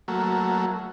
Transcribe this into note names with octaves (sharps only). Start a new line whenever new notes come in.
F#3 A3 A#3